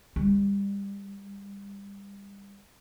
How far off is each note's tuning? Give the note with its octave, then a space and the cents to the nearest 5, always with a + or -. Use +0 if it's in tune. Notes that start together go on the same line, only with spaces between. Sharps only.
G3 +30